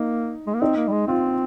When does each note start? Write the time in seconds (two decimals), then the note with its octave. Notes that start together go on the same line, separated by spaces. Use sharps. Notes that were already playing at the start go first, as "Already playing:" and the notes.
Already playing: A#3 D#4
0.47 G#3
0.54 A#3
0.62 C4 D#4
0.76 A#3
0.88 G3
0.92 G#3
1.07 C4 F4